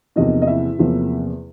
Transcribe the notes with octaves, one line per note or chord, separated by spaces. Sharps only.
E2 C3 F3 A#3 D#4 D#5
D#5
E4 E5
E2 C3 F3 A#3